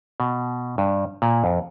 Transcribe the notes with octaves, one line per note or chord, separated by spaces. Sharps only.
B2
G2
A#2
F2